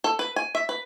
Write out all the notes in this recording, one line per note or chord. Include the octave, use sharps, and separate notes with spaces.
A4
B4
G#5
E5
B4